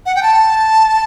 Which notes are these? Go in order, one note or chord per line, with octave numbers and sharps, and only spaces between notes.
F#5
G5
A5